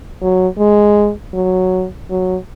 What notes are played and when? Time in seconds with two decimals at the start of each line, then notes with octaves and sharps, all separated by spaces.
0.21 F#3
0.58 G#3
1.34 F#3
2.10 F#3